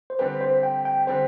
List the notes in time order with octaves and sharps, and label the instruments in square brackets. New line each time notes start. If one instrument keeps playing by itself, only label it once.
[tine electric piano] C5
[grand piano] D3 G3 C4 G4 [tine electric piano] B4
[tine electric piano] C5
G5
G5
[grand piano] D3 G3 C4 G4 [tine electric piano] C5